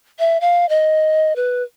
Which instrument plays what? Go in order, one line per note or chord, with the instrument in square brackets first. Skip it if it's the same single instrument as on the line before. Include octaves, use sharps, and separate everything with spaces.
[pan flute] E5
F5
D#5
B4